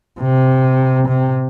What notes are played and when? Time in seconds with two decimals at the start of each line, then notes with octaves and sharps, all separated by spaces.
0.20 C3
1.08 C3